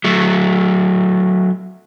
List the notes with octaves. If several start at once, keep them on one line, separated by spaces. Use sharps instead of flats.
F#3 A3